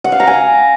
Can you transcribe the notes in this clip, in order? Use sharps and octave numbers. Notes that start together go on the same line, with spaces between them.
F#5
F5
A#5
G#5